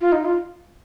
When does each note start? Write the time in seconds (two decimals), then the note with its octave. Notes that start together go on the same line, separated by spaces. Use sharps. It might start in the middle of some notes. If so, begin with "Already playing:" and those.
0.01 F4
0.12 D#4
0.25 F4